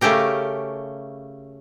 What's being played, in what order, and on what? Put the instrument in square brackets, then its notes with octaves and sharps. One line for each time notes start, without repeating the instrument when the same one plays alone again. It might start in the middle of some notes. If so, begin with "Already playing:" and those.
[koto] C#3 A3 C#4 G4 A#4